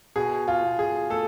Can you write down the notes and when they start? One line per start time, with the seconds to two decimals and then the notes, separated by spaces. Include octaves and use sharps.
0.16 B2 G#4
0.48 F4
0.64 B2
0.79 G#4
1.10 A3 A4